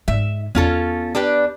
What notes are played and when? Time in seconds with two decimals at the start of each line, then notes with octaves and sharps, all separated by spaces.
0.08 G#2 D#4 E5
0.55 E2 B3 C#4 F4 A4
1.15 D4 G4 B4